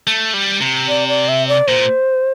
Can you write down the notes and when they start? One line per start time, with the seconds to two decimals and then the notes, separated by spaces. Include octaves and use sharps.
0.07 A3
0.34 G3
0.61 C3
0.88 D5
1.08 D5
1.28 E5
1.48 D5
1.68 A#2 C5